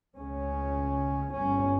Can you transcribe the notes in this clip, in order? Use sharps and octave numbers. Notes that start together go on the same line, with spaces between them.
C#2 C#3 C#4
G1 G2 C#4